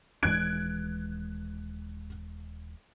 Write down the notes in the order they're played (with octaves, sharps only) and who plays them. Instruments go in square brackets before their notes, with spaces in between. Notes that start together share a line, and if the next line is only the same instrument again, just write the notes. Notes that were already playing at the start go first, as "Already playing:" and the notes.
[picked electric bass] D#1 E3 G#3 [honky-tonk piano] F#6 G#6 D7